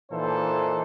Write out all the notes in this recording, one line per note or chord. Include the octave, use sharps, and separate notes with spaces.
A#2 E3 D#4 A4 C5